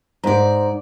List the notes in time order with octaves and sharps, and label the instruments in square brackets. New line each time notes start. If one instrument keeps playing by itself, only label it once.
[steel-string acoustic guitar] G#2 D5 [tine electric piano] D#4 C5 A#5